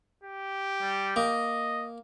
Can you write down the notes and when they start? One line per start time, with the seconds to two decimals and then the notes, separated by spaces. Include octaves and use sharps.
0.24 G4
0.81 G3
1.16 A#3 D#5